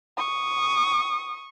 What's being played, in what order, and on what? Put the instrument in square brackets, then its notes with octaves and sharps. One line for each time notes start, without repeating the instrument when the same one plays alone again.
[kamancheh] C#6 D#6